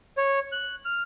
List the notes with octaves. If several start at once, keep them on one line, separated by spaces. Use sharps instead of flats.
C#5
F#6
F6